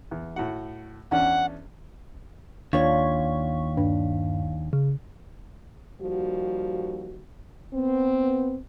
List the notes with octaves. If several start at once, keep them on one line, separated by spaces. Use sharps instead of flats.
E2
A2 F#4 F#5
E2 C#4 D4 F#5
D#2 D4 F4 C#5 F5 C#6
G2 D4
C#3
D#2 F3 G3 F#4
B3 C4